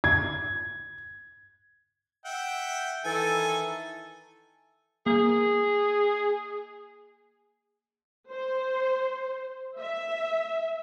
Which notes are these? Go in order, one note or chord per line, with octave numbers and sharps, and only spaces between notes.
G#6
E5 F#5 G5
D#3 E3 A4 G#5
A#3 G#4
C5
E5